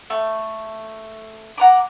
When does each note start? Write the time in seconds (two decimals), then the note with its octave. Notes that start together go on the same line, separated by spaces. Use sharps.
0.10 A3
1.58 F#5 A#5 D6